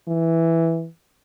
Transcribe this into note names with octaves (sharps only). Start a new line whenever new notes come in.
E3